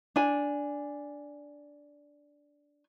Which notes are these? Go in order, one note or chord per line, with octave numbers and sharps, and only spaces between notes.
D4 G#5